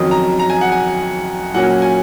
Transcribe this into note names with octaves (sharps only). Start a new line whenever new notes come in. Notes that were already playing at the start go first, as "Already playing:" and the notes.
Already playing: F2 D#3 F#3 C#4 D#6
A#5
A#5
G#5
F#5
G#5
A#2 F#3 A#3 C#4 F#5
G#5